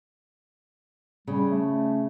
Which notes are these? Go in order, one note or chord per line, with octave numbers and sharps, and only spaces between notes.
C#3 G3
A3